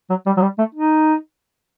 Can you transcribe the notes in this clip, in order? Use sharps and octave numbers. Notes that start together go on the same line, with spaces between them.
F#3
G3
F#3
G3
A3
D#4